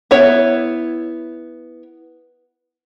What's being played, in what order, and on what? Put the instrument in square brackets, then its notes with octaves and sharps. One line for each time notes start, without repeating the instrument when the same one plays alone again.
[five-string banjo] B3 E4 C#5